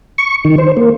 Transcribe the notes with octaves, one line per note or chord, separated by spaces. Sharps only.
C#6
D#3
C5
A#3